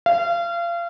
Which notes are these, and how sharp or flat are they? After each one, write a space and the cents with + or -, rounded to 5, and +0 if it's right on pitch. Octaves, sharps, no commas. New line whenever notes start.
F5 -30